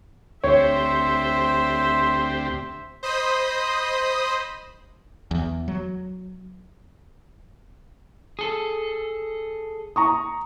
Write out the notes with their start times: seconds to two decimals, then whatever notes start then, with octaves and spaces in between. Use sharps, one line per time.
0.44 D2 C4 G4 C5 C#5 E5
3.03 C5 D#5 B5 D#6
5.31 E2
5.68 F#3
8.39 G#4 A4
9.96 A#5 C#6 D#6